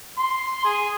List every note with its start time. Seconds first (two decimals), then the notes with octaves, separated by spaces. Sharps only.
0.18 C6
0.65 G#4